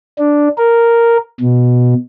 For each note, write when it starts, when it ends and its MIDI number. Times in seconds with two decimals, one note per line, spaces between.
0.18 0.48 62
0.58 1.17 70
1.41 1.94 47